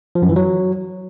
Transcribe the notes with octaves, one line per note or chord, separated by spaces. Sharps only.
F3
F#2
E3
F#3